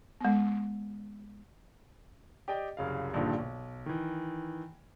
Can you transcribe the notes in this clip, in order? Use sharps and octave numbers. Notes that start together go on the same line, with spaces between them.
G#3 B3
G4 D5 D#5 G5
C2 F#2 C#3 F5
A#1 G2 A#2 D3 D#3 F3
B1
D#3 E3